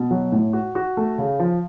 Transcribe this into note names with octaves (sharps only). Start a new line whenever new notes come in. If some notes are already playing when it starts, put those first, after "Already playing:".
Already playing: B2
F#3
A2
F#4
F#4
A3
C#3
F3